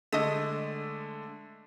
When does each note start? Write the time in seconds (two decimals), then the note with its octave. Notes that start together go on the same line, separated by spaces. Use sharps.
0.12 D3 G#3 A3 D#5 D#6